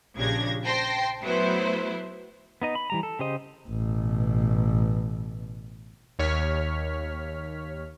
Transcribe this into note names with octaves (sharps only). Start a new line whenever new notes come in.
A#1 C#3 D4 G4 G#6 A#6
C5 G5 A5 C6 A#6
F#3 A3 B3 E4 C5
B3 D#4 D#5
B5
E3 G3 A#5
A4
C#3 G4 C5 D#5
A1 B2
D#2 C#5 F6 B6